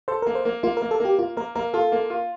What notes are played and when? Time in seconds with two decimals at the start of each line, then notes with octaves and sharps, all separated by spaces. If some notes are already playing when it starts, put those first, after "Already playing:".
0.08 A4 C5
0.22 A#4
0.27 A#3
0.35 C5
0.45 A#3
0.63 A#3 F4
0.77 A#4
0.82 A#3
0.91 A4
1.00 A#3 G4
1.19 A#3 F4
1.37 A#3 A#4
1.55 A#3 A#4
1.74 F4 A4
1.92 A#3
2.10 F4